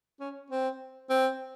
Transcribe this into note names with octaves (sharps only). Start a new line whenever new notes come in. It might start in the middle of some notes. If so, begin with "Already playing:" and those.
C#4
C4
C4